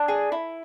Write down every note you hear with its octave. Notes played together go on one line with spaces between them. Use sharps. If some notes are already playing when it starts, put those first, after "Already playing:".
Already playing: D4
G#4
E4